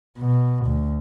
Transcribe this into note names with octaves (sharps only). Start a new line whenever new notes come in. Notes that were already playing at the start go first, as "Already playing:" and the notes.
B2
D2